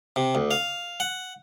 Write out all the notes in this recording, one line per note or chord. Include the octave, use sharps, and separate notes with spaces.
C3
D2
F5
F#5